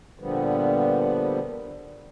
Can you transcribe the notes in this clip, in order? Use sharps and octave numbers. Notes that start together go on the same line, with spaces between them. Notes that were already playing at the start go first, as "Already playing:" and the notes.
A#2 D3 F3 G3 B3